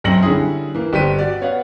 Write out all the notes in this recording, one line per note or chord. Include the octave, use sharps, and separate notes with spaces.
B1 F#2 C4 A#6 C#7 F#7
D3 G3 C#4 E4 G#4
E3 A#3
G1 G4 C5 B6 D#7
F#4 D5
B3 C#5 F5 F#5